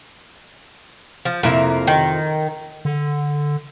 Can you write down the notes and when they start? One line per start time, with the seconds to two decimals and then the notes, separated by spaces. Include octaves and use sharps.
1.25 F3
1.43 F2 C3 A#3 E4
1.87 D#3
2.85 D3